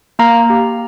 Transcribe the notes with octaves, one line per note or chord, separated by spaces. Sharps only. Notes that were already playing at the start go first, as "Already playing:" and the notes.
A#3 F5 A#5
G4